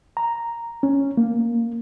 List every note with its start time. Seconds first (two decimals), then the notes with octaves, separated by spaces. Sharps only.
0.17 A#5
0.83 C#4
1.17 A#3